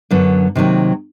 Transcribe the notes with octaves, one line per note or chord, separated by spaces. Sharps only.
F#2 D3 F#3 B3
C3 D#3 F#3 A#3